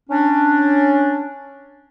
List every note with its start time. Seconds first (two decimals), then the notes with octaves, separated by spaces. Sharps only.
0.10 C#4 D4